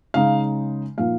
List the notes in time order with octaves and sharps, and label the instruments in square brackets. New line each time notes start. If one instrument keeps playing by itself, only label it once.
[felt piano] C#3 G#3 D#4 F5
A#2 F3 A#3 D#4 F5